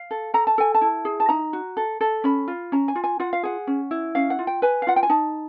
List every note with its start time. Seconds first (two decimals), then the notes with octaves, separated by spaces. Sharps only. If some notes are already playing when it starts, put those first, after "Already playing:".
Already playing: F5
0.11 A4
0.34 A4 A#5
0.47 A5
0.58 A4 G#5
0.75 A5
0.81 E4
1.05 G#4
1.20 A5
1.29 D#4 A#5
1.53 F#4
1.77 A4
2.01 A4
2.24 C#4 B5
2.48 F4
2.72 C#4 A#5
2.88 G#5
2.96 F4
3.04 G#5
3.20 F4 F#5
3.33 F5
3.43 G#4 F#5
3.67 C#4
3.91 E4
4.15 C#4 F5
4.30 F#5
4.39 F4
4.47 G5
4.62 B4 G#5
4.82 F5
4.87 F4 F#5
4.96 G5
5.03 G#5
5.09 D#4 A5